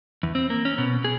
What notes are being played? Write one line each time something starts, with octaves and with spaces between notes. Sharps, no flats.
E2
C4
A#3
C#4
B2
G#4